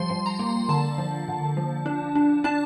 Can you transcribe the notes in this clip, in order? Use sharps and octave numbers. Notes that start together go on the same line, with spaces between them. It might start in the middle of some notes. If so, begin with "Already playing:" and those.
Already playing: F3 G3 C6
F3
A#5
A#3
D3 A5
F3
D3
F3
D4
D4
D4 A5